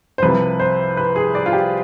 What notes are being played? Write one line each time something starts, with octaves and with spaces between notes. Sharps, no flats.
C5
C2 C3 F3 B4
C5
B4
G#4
D5
F4
G4